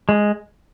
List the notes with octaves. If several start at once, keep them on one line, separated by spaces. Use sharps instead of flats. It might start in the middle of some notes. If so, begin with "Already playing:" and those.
G#3